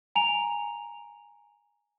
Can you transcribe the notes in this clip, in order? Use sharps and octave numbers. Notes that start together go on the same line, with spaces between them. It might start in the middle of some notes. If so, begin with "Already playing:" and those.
G#5 A#5 D7 F7